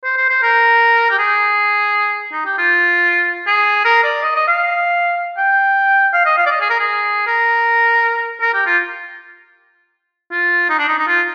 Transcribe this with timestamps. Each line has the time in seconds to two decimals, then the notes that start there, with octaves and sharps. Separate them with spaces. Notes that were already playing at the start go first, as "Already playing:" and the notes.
0.04 C5
0.17 C5
0.29 C5
0.43 A#4
1.10 G4
1.18 G#4
2.32 D#4
2.45 G4
2.58 F4
3.47 G#4
3.85 A#4
4.04 D5
4.23 D#5
4.36 D#5
4.48 F5
5.37 G5
6.14 F5
6.25 D#5
6.38 F5
6.46 D5
6.51 D#5
6.61 G#4
6.70 A#4
6.80 G#4
7.27 A#4
8.41 A#4
8.54 G4
8.67 F4
10.32 F4
10.69 D#4
10.79 D4
10.88 D#4
10.98 D#4
11.07 F4